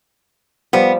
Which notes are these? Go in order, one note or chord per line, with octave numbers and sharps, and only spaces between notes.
F3 G3 B3